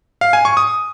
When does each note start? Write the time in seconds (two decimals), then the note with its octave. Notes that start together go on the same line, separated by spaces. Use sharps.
0.21 F5
0.33 G#5
0.45 C#6
0.57 D#6